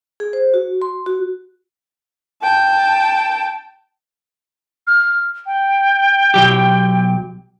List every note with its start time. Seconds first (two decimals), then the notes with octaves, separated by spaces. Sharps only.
0.20 G#4
0.33 C5
0.54 F#4
0.82 C6
1.06 F#4
2.42 G5 A5
4.87 F6
5.46 G5
6.34 B1 F#3 G4